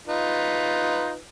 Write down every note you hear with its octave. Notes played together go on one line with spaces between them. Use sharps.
D#4 F4 B4